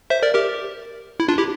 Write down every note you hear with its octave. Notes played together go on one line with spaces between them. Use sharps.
C5 E5
A#4 D5
G4 A#4
E4
D4 F4
E4 G4